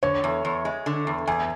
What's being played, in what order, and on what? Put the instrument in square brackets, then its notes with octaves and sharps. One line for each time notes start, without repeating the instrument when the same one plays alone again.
[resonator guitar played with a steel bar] D3 [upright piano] C#5
[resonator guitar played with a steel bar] E2
E2
G#3
D3
E2
[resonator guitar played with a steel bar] E2 [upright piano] G#5